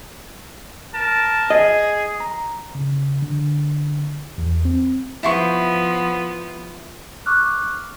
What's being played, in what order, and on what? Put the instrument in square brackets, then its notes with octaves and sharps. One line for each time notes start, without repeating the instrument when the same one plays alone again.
[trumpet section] A#4 A5
[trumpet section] G#4 [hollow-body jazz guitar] D#5
[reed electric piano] A#5
C#3
D3
E2
C4
[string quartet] F3 B3 [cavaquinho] E4 C6 C#6
[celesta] C#6 D6 F6 F#6